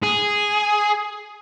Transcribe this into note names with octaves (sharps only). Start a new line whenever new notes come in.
G#4